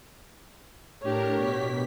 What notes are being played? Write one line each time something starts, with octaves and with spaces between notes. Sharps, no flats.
A2 D4 G4 A#4 C#5
B2 B6